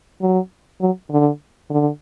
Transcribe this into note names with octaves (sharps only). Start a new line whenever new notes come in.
F#3
F#3
D3
D3